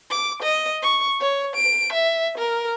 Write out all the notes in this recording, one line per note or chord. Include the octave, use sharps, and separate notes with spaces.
D6
D#5
C#6
C#5
D7
E5
A#4